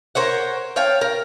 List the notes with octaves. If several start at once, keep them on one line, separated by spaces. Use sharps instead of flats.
A#4 C5 C#5 F#5
C#5 F5 G5 A5
A#4